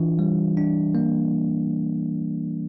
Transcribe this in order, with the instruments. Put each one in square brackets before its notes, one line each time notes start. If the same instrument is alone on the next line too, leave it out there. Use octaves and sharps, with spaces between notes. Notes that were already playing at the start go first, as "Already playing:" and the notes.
Already playing: [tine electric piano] E3 D4 F4
G3
D4
A#3